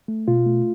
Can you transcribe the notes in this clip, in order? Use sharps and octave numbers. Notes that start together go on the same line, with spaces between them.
A3
B2 F4
A3